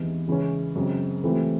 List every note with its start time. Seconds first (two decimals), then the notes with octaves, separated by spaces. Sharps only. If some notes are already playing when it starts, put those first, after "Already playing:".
Already playing: E2 C3 E3 G#3 D#4
0.28 C#3 E3 G#3 C#4
0.75 F#2 C#3 G#3 C4
1.23 C#2 C3 E3 A3 C4